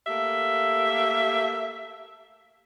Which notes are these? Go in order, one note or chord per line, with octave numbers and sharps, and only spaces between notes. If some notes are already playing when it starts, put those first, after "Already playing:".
A3 A#3 G4 E5